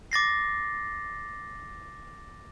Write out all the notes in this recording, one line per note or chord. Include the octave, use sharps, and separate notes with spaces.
D6 A6 A#6 C7